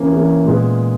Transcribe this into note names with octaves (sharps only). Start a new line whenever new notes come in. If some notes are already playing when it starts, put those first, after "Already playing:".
Already playing: E3 A#3 C#4
E3 A#3 C#4
A#2 G#3 B3